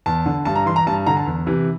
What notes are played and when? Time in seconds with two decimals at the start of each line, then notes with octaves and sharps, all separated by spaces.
0.06 E2 A5
0.26 D3
0.45 G2 A5
0.56 A#5
0.66 E3 C6
0.76 A#5
0.87 G2 A5
1.06 D3 A#5
1.17 A5
1.26 E2
1.47 C3 E3